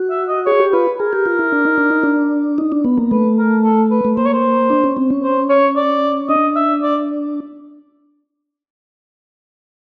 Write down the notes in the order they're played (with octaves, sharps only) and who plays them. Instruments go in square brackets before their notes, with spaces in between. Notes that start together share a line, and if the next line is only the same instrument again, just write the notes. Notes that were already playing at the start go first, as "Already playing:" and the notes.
Already playing: [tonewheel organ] F#4
[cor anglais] E5
D#5
[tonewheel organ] G#4 [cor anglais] C#5
[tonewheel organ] G4
[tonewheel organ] F4 [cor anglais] B4
[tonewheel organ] G#4 [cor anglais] A#4
[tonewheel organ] G4
F4
E4
D4
D#4
D4
D#4
D4
D#4
D4
B3
A#3
[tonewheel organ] A3 [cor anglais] B4
[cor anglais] A#4
A4
B4
[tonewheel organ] A3
[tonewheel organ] A#3 [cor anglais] C5
[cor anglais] C#5
C5
[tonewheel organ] D4
C#4
C4
C#4
[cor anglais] C5
C#5
D5
[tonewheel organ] D4 [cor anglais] D#5
[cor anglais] E5
D5